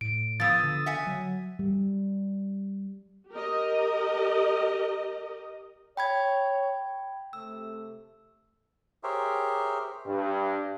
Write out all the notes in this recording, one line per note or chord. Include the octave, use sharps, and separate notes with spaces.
A2 D7
F3 B3 D#6 E6 A6
D3
E5 F#5 G#5
F#3
G3
G4 A#4 D#5
C#5 G5 B5 G#6
C3 A3 E6
G4 G#4 A#4 C5 C#5 E5
G2